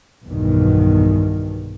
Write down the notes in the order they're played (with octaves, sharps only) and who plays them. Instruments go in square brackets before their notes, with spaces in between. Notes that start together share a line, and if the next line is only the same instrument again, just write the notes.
[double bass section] B1 E2 G2 B2 D#3